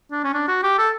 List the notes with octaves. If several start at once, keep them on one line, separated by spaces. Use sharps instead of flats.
D4
C#4
D4
F#4
G4
A4